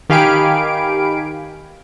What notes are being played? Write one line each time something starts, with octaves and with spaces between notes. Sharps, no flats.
D#3 G4 F5 G#5 B5 D7